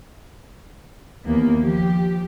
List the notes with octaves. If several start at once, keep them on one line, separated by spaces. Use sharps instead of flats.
D#2 E3 A#3 B3
F3 G4